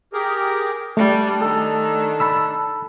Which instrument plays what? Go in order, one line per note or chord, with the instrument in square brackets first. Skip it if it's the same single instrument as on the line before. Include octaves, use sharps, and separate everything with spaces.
[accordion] G4 G#4 A#4
[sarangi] G3 [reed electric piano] A3 [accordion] D4
[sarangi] D#3 [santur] A4
[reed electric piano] A5 B5 E6